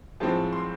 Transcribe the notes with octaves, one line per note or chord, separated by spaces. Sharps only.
A2 F3 G#3 C4 A5
C6